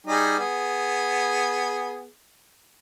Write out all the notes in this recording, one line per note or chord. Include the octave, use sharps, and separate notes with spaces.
G3 D#4 G#4
B3 G#4